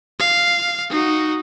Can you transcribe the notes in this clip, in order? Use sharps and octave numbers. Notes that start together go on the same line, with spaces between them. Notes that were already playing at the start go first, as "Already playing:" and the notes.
F5
D#4 F#4